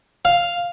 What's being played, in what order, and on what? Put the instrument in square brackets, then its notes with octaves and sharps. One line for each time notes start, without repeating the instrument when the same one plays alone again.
[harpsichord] F5